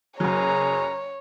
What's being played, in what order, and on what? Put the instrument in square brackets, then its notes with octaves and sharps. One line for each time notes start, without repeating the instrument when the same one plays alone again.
[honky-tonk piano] F#1 F#3 [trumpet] G#4 [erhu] C#5 [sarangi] A#5